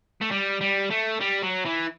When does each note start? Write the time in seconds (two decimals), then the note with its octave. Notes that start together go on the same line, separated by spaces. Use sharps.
0.21 A3
0.31 G3
0.61 G3
0.91 A3
1.20 G3
1.42 F#3
1.65 E3